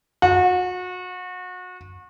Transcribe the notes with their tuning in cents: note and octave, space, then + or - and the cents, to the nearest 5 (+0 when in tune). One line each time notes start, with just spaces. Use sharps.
F#4 -30